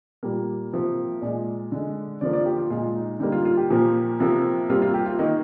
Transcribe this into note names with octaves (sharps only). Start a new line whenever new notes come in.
A#2 G3 A#3
C3 F3 A#3
A#2 G#3 D5
D3 G#3
D3 F3 A#3 D5
D5
F4
G4
F4
A#2 G#3 F4
D#4
D3 G3 A#3 D#4
F4
F4
G4
A#2 F3 A#3
C3 F3 A#3
C3 G3 A#3 F4
F4
G4
F4
D#3 A#3 D#4